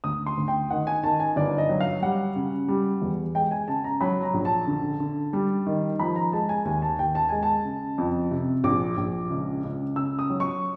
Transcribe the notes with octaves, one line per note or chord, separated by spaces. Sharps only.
D2 D#6
C6
D2
G5
D#3 F#5
G#5
D#3 A5
G#5
G1 D5
D#5
F#3
F5
G3 F#5
C#3
G3
E2
G#3 G5
G#5
C#3 A5
A#5
F#3 B5
A#5
A#1
A5
D3
D3
G3
D#3
F3 B5
A#5
G#3 A5
G#5
D#2 G#5
A5
D#2 G5
A5
G#3 G#5
A5
C#3
F2
C3
A#1 D6
A#1
C#2
C#2
C#3 E6
D#6
F#3
C#6